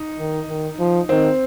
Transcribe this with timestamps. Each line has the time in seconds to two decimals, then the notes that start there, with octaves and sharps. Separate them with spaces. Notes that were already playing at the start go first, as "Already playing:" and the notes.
Already playing: D#4
0.19 D#3
0.49 D#3
0.79 F3
1.09 D#3 C4